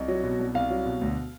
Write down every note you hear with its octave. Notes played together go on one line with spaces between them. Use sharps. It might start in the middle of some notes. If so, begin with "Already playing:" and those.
Already playing: C2 D#5
F#3
B2
C2
C2 F5
F#3
B2
D2